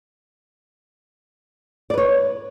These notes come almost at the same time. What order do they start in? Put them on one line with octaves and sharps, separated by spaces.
D5 B4 C#5